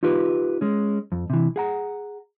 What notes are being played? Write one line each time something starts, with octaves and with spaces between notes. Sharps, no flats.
D#4 F4 G4 B4
G#3 C#4
F2
C3 E3
G#4 F#5 A#5